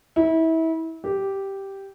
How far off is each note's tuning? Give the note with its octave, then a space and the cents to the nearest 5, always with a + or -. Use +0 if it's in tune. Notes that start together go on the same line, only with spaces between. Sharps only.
E4 -30
G4 -5